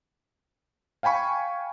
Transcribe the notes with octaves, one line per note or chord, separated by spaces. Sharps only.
F5 G5 G#5 B5 C#6